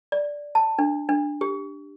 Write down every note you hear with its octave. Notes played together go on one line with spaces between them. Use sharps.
D5
A5
D4
D4
G4